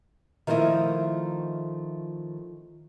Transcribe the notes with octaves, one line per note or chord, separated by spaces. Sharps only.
D#3 F3 A3 E4 D#5